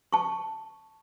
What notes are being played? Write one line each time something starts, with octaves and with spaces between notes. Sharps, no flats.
A5 C#6